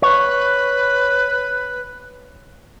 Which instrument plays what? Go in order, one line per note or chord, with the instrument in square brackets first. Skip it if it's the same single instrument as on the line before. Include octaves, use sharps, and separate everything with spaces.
[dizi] B4 [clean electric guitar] C#5